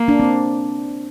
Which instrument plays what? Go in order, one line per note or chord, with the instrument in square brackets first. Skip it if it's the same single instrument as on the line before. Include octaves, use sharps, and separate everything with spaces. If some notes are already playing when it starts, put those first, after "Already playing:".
Already playing: [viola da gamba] A#3
[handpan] D4
C4